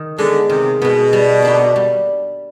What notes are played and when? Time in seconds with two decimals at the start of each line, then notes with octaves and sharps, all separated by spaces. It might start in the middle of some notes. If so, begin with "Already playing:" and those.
Already playing: D#3
0.18 D3 G#3 B3
0.49 C3 D#3
0.82 B2 G#3 B3
1.13 G3
1.42 A#3 D4 G4
1.76 G3